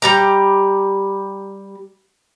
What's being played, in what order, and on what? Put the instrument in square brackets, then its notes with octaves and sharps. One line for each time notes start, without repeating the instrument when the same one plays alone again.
[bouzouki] G3 G4 A#5